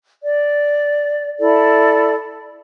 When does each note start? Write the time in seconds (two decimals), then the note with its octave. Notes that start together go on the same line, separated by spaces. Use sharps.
0.22 D5
1.39 E4 A4 D5